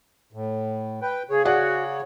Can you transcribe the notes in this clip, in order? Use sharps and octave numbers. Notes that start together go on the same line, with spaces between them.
A2
B4 G5
C#3 G#4 C#5
F#4 G#4 D5 F#5